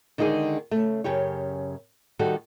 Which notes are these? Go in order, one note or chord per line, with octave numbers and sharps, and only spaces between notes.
D3 D#3 G#3 D#4 G4 G#4
C#3 A3
F#2 C#3 G4 C#5
D#3 G3 F#4 A4